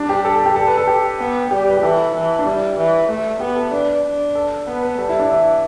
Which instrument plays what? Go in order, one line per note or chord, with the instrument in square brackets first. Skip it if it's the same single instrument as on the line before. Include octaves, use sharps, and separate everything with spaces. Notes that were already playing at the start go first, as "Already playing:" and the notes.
Already playing: [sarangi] G3 [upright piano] D4
[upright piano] G4
A4
A4
G4
A4
B4
A4
G4
[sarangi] B3
[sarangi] G3 [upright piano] G4
[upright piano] B4
G4
[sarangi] E3 [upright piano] A4
[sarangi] E3
[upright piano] D4
[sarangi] G3 [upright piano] E4
[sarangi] E3
A3
[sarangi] B3 [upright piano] G4
[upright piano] A4
[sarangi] D4 [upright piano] B4
[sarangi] D4
[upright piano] A4
[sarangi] B3 [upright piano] B4
[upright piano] B4
[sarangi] G3 [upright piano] A4
[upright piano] E4
D4
[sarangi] E3 [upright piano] E4